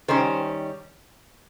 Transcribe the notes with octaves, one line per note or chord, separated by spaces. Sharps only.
D#3 G3 C#4 C5